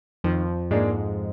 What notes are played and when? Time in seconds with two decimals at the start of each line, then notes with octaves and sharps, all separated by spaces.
0.24 F2 D#3 F3
0.71 G#2 G#3 A#3 D4 G#4